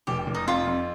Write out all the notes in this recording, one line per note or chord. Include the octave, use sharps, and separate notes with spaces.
F1 G4
F1
D#4
F2 F4
F2